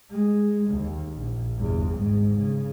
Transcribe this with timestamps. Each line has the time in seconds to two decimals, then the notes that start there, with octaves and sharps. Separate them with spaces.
0.11 G#3
0.70 D#2
1.16 A#1
1.59 G1 E2
1.94 G#1 G#2
2.38 C#3